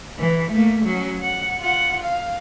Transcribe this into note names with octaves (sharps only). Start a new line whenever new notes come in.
E3
A3 A#3
F#3 C#4
F#5
F4 F#5
F5